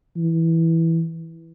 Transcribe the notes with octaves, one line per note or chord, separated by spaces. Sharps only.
E3